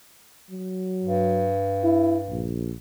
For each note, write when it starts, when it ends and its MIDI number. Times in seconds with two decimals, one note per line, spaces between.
0.50 1.57 54
1.04 2.56 43
1.84 2.17 64
2.30 2.74 34